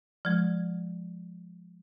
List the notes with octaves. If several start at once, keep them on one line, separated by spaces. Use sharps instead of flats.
F3 G#3